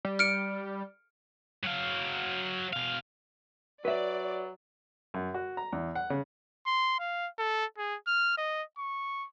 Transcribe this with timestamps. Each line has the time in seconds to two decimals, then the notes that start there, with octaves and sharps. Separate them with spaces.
0.05 G3
0.19 F6 C#7 D7
1.64 F#3 F5
2.73 B2 F5
3.85 F#3 B4 D5 E5
5.14 F#2
5.34 F#4
5.57 A#5
5.72 E2
5.95 F#5
6.10 C#3
6.67 C6
7.00 F5
7.39 A4
7.78 G#4
8.07 F6
8.38 D#5
8.78 C#6